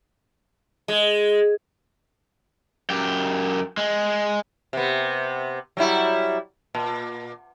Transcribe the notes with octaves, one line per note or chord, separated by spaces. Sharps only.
G#3
F#2 G4
G#3
C3 B3
F#3 G3 E4
A#2